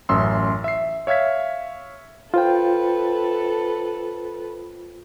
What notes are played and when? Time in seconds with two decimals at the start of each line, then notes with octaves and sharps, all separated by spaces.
0.09 A1 F#2 E5 C6 E6
0.64 E5 C7
1.07 C#5 E5 F5 G#6 B6
2.34 F4 A4 B4 C5 G5